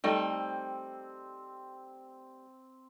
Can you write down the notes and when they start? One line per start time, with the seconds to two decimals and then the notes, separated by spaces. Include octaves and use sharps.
0.04 G3 A3 C4 D#4